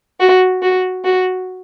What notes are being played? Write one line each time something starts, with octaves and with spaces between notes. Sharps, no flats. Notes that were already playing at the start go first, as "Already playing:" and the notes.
F#4
F#4
F#4